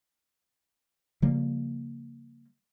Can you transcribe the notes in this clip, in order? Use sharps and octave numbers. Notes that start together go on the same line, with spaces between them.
C#3 F3 G3 A#3